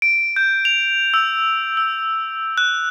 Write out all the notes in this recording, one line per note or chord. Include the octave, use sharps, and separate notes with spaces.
D7
G6
F7
E6
E6
F#6